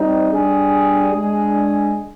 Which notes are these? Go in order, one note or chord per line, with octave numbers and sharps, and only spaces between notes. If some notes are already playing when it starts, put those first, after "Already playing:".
Already playing: G3 C4 D#4
G3 D4 G#4
G#3 D4 G#4